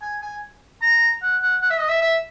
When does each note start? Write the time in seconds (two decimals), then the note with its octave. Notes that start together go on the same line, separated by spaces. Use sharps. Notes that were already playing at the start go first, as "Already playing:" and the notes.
0.02 G#5
0.22 G#5
0.82 A#5
1.22 F#5
1.42 F#5
1.62 F#5
1.70 E5
1.79 D#5
1.88 E5
2.01 E5